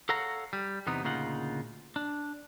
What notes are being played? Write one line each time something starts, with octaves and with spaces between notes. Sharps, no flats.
A4 C#5 F5 F#5 A#5
G3
E2 C3 B3 D#4
D2 A#2 C#3 D#4 F4 F#5
D4